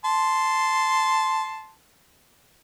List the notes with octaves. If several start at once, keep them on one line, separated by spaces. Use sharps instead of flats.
A5 C6